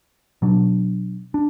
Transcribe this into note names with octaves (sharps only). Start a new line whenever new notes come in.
B2 F#3 D4
D4